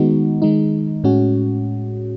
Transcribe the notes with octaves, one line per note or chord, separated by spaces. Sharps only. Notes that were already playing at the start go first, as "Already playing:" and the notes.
Already playing: D#3 G#3 B3 D#4 F#4
D#3 G#3 D#4
A2 G#3 C#4 F#4